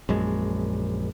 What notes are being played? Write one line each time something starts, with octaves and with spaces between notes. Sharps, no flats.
A#1 F#2 G#3